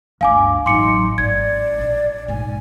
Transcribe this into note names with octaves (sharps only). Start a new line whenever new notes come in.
G1 D2 F5 G#5 D6
A1 F#3 D#4 C6 D6 C#7
G#1 C4 D5 G#6
A#1
B1 G#2 G#5